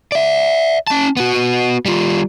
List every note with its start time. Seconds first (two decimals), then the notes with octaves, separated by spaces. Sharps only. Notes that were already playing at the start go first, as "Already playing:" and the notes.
0.12 D5 E5
0.87 C#4 A5
1.17 B3 F#4
1.85 G3 F4